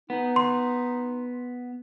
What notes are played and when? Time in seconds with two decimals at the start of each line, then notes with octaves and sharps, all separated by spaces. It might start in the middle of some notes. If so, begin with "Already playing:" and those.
0.10 B3 D#4
0.36 C6